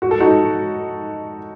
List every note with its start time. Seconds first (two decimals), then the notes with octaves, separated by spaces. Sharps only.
0.02 F#4
0.11 A4
0.20 D#4 F#4